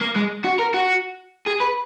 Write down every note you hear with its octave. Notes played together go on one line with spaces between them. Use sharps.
A#3
G#3
F#4
A#4
F#4
G#4
B4